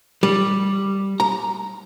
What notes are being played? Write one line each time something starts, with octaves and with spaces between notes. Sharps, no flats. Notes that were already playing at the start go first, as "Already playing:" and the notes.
G3
A#5